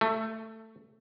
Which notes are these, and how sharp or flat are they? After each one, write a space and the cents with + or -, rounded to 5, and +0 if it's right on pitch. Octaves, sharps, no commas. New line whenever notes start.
A3 +15